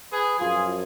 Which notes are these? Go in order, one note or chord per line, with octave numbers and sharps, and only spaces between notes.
G#4 B4
F#2 F3 F4 G#4